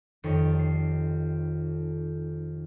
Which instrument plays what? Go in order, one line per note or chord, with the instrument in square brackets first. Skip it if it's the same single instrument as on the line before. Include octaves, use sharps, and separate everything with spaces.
[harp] F1 F2 D#3 C#5
C7